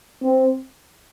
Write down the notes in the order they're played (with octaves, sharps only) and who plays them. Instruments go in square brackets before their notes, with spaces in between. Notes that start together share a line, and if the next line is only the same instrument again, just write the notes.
[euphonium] C4